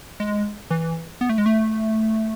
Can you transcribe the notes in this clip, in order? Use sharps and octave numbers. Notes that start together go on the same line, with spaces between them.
G#3
E3
B3
A3
G#3
A3